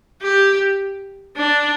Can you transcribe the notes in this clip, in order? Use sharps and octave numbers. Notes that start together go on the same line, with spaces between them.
G4
D4